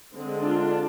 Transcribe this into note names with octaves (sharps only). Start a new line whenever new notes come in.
D3 G#3 C4
D4 F4